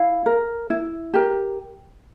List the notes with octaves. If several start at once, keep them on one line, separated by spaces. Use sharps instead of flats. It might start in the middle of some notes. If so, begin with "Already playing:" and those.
Already playing: E4 F5
A#4
E4
G4 A#4